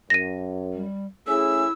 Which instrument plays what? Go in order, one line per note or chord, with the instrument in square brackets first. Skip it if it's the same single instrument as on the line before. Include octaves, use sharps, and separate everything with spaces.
[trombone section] F#2 [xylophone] A#6 D#7
[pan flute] G3
[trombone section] A3 C#4 G#4 [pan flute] E4 [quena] E6